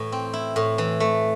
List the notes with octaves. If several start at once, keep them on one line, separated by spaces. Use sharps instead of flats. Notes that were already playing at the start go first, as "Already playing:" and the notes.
Already playing: A2 E3
C4
E4
A2
E3
A3